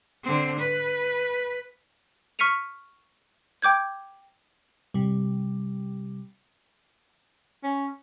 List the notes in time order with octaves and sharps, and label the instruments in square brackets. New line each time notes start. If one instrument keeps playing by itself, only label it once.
[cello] D3 C4
B4
[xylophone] C#6 F6 B6 C#7 D#7 F7
G5 D6 G6 G#6
[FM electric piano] C3 G3
[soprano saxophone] C#4